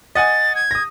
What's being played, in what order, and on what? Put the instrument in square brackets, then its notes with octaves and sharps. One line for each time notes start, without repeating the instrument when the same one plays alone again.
[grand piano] D#5 F#5 G#5 [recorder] A6
[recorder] G#6
[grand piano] D#6 A#6